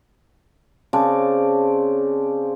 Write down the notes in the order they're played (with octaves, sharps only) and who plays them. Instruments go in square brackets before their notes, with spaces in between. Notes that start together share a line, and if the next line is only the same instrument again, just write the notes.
[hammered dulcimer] C#3 C4 D5 A5